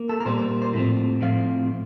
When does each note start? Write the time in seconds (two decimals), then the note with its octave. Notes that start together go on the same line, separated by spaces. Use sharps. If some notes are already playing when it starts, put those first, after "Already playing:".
Already playing: A#3
0.09 A4
0.20 A#4
0.26 A#2 G3 A#3 C5
0.38 C5
0.62 C5
0.73 A2 F3 C4
1.21 A2 F3 C4 F5